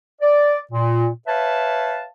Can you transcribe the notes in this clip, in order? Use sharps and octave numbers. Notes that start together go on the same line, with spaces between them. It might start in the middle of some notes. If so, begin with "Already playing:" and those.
D5
A#2
B4 C#5 E5 F5 A5